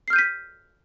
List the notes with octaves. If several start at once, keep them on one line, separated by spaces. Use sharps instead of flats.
F6 G6 B6 C7 D#7